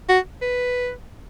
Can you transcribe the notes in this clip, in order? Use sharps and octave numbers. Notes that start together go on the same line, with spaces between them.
F#4
B4